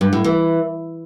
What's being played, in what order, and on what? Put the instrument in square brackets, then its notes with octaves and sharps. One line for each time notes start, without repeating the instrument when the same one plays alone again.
[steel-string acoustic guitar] G2
A2
E3